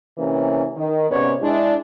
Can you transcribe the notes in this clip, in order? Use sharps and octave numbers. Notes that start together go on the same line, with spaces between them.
C3 E3 A#3 C#4
D#3
G#2 C3 B3 C#4 C#5 D5
G#3 D4 E4